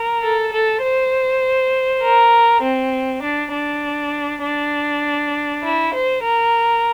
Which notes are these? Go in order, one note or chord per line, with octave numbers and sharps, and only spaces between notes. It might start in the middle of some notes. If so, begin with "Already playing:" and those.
Already playing: A#4
A4
A4
C5
A#4
C4
D4
D4
D4
E4
C5
A#4